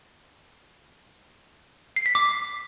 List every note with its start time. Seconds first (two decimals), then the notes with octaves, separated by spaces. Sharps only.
1.96 C7
2.06 B6
2.15 D6